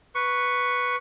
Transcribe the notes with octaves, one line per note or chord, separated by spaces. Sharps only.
B4 C#6